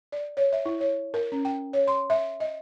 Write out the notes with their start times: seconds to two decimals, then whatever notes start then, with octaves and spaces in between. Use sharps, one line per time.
0.12 D5
0.37 C#5
0.53 E5
0.66 E4
0.80 C#5
1.14 A#4
1.32 C#4
1.45 G5
1.73 C#5
1.88 C6
2.10 E5
2.40 D#5